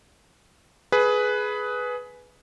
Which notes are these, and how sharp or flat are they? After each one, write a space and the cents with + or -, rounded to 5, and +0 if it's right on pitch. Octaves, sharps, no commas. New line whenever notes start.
G#4 +15 B4 +0